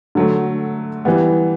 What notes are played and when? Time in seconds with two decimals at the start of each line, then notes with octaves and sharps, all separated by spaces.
0.15 D3 F#3 A3
1.05 E3 G3 B3